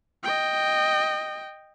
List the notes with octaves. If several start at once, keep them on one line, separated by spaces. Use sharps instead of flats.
D#5 G5